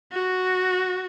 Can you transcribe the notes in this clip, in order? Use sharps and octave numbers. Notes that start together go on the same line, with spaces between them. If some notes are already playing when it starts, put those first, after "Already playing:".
F#4